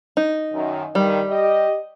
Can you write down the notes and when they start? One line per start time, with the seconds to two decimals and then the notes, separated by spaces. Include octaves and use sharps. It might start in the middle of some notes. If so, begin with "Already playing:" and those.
0.17 D#4
0.53 F#2 D#3
0.95 G2 D#3 G3
1.29 G4 D#5